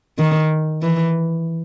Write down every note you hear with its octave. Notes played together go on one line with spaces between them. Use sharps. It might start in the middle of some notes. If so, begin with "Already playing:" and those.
D#3
E3